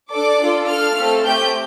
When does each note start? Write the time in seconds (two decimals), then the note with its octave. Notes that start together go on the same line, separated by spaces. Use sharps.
0.11 D4 A4 D5 D6
0.40 D4 F4 A4
0.68 D4 A4 F5 F6
0.97 A3 C4 A4
1.25 A3 C4 G4 G5 G6